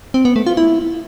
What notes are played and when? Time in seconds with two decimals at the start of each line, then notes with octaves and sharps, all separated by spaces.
0.14 C4
0.25 B3
0.36 A3
0.46 F4
0.57 E4